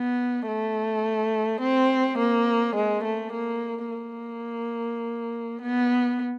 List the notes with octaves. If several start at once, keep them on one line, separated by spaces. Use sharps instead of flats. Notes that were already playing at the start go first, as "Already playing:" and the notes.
Already playing: B3
A3
C4
A#3
G#3
A3
A#3
A#3
B3